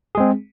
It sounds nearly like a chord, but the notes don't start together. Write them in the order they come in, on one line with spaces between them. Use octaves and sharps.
G#4 G#3 C4